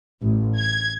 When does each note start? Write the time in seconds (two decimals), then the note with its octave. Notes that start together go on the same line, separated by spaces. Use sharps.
0.21 A1
0.58 G#6